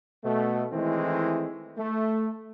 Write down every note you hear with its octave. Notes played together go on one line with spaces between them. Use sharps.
B2 A3
D#3 E3 G#3 A3 C4 E4
A3